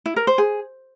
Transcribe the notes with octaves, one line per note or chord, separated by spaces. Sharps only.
E4
A#4
C5
G#4